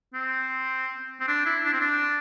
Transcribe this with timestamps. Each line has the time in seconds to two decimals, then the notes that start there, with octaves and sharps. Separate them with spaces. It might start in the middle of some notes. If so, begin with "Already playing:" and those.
0.14 C4
1.20 C4
1.28 D4
1.46 E4
1.64 D4
1.73 C4
1.80 D4